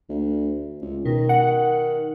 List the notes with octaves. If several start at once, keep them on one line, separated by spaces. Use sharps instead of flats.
D2
C#2
B2 D#3
F#5